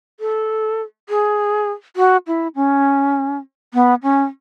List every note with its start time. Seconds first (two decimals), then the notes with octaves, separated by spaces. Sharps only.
0.20 A4
1.09 G#4
1.96 F#4
2.27 E4
2.55 C#4
3.74 B3
4.03 C#4